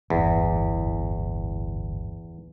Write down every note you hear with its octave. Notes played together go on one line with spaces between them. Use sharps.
D1 G1 E2